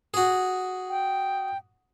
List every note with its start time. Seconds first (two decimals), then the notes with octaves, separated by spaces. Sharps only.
0.14 F#4 G#4
0.89 G5